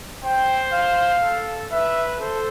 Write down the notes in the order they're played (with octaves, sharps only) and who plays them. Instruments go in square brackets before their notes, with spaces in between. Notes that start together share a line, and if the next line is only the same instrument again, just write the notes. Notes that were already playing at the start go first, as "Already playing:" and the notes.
[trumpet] C5 [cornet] G5
[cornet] F5
[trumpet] A4
[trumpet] B4 [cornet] E5
[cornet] A4 [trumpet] C5